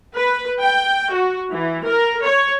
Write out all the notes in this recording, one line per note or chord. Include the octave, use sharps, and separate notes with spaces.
B4
G5
F#4
E3
A#4
C#5